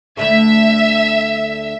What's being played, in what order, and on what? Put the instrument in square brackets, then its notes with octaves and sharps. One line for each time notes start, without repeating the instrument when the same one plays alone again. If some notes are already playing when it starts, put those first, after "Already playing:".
[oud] D2 D3 A3 [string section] E5